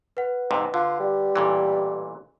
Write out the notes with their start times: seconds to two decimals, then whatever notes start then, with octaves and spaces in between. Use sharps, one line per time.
0.17 B4 F#5
0.51 F2 G#2 C3
0.74 D3 F4
1.00 G3
1.35 A1 A#2 E3